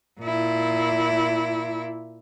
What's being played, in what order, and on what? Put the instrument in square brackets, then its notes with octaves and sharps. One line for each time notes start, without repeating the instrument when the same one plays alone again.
[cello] A#2 E4